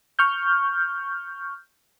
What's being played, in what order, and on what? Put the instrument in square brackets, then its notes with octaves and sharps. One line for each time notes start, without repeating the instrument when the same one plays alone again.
[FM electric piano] C#6 F6 G6